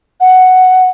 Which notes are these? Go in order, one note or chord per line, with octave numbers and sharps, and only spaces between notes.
F#5